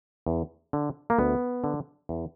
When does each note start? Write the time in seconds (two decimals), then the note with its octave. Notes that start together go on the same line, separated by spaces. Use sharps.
0.27 E2
0.73 D3
1.10 A#3
1.18 D2 B3
1.64 D3
2.09 E2